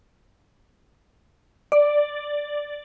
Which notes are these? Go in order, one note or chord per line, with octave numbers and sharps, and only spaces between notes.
D5